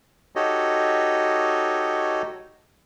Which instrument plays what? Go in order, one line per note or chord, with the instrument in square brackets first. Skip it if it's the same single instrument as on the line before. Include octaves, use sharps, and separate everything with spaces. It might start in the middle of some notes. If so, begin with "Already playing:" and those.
[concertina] D#4 F#4 G4 A4 C#5 D#5